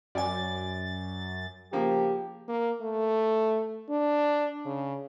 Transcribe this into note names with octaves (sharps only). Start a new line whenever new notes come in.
F#2 D5 G#5 A6
C#3 F3 A#3 G4
A#3
A3
D4
C#3